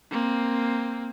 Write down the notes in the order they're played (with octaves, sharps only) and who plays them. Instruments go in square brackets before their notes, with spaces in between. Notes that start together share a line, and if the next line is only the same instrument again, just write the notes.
[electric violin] A#3 C4